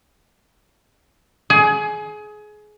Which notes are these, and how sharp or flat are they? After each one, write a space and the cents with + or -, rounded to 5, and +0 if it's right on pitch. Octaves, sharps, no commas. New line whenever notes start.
G#4 +25